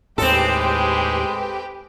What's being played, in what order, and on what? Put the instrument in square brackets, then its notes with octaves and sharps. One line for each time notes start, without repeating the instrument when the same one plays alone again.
[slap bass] D#2 A2 [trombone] G#3 [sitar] C4 A4 [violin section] G4 B4 G5